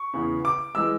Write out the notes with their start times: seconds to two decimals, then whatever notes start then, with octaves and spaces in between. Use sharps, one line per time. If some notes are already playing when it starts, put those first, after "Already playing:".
Already playing: C#6
0.14 E2 C#3 E3
0.45 D6
0.75 E3 G#3 E6